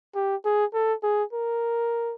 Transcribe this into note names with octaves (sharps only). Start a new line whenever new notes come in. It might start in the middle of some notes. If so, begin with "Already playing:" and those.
G4
G#4
A4
G#4
A#4